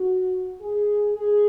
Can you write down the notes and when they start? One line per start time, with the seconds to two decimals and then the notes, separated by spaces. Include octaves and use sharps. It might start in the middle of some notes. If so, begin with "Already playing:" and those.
Already playing: F#4
0.61 G#4
1.12 G#4